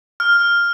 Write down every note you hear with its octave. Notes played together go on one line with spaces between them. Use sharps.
F6